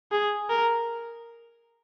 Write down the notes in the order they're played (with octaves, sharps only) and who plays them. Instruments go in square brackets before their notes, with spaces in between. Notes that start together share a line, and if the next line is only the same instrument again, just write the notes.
[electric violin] G#4
A#4